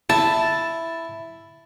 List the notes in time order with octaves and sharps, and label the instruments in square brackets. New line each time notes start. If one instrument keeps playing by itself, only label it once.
[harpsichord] E4 [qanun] A5